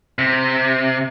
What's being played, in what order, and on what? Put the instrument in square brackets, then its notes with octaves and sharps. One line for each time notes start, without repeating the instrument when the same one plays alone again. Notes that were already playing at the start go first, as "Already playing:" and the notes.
[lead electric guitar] C3